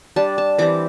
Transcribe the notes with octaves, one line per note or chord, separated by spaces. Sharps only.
G3 D4 A5
A5
E3 G3 C4 D6